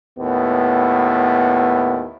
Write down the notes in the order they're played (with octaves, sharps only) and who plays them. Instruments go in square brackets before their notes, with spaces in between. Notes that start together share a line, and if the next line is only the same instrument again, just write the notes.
[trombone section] D#2 A2 B3